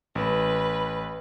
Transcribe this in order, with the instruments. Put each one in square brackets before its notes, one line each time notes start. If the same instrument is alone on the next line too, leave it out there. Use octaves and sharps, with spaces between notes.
[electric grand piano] A1 [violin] B4